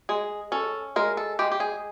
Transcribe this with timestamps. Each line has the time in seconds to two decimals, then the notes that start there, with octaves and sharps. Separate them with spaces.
0.09 G#3 G#4
0.52 C#4 A4
0.96 G#3 A#4
1.17 A4
1.39 G#3 G4
1.52 G4
1.60 G#4